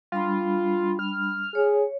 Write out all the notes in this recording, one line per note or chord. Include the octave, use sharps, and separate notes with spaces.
G3 D4 F4 B5
F6
G#4 C#5